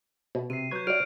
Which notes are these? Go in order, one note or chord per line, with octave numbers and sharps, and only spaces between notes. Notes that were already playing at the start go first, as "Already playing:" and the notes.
B2
C3 C7 D#7
F#3 B4 C#6 G6 G#6
F#3 D5 F6 D7